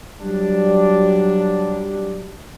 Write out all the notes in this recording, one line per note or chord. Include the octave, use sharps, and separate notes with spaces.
F#3 G3 D4